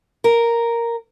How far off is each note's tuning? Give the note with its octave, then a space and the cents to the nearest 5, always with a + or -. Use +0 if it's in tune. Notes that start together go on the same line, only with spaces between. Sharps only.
A#4 +0